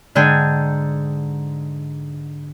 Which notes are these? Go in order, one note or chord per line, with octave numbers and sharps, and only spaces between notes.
G#2 D3 G5 G#5